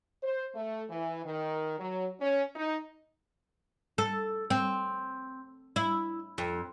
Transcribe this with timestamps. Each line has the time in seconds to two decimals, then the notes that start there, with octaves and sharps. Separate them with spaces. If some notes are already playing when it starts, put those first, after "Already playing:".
0.23 C5
0.55 A3
0.90 E3
1.25 D#3
1.79 F#3
2.21 C#4
2.56 D#4
3.98 A4
4.50 C4
5.76 E4
6.38 F2